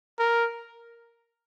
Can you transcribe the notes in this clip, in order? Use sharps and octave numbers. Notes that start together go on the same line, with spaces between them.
A#4